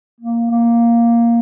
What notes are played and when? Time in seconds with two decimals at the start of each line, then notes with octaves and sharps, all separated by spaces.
0.20 A#3
0.51 A#3